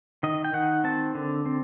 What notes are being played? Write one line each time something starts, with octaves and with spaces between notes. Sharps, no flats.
D#3 D#5
G5
D#3 F#5
C4 A5
D3
C4